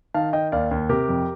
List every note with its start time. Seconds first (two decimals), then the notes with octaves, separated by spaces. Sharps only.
0.14 D#3 F5 A5
0.33 D#3 D#5 G5
0.52 D#2 D5 F5
0.71 D#2
0.89 C3 G4 A#4
1.09 F2